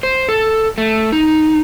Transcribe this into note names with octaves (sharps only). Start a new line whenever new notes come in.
C5
A4
A3
D#4